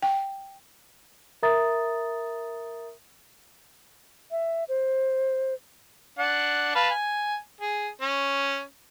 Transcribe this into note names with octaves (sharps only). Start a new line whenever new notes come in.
G5
A#4 E5 A#5 D#6 A6
E5
C5
D4 F#5
B4 F5 A5
G#5
G#4
C#4